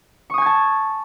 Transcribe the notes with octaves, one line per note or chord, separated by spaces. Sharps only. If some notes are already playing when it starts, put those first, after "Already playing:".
G#5 A5 C#6 D#6 G#6